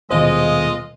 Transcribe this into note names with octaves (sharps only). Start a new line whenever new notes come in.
D#1 B2 G#3 F4 C5 D#5